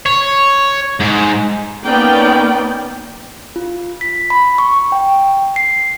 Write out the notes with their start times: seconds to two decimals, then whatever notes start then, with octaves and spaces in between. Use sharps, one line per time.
0.06 C#5
1.00 G#2
1.85 A#3 B3 C#4 D#4 D5 G5
3.56 F4
4.01 B6
4.30 B5
4.58 C#6
4.92 G5
5.56 C7